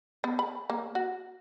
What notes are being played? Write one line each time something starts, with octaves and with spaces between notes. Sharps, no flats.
B3
B5
A#3
F#4